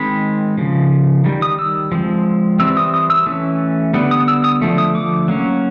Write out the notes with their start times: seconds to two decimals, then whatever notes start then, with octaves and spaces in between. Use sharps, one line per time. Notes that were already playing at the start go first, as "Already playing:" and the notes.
Already playing: D#3 G#3 C4 B5
0.58 C#3 F3
1.24 D#3 G3
1.42 D#6
1.59 E6
1.92 F3 G#3 C4
2.59 E3 G3 C4 E6
2.77 D#6
2.94 D#6
3.10 E6
3.26 E3 A3 C#4
3.94 D3 G3 B3
4.11 D#6
4.28 E6
4.44 D#6
4.62 D3 F3 A3
4.78 D#6
4.95 D6
5.28 F#3 A#3 C#4